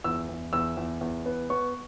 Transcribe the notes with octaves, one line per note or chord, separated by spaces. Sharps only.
E2 E6
E2
E2 E6
E2
E2
B3
B3 C#6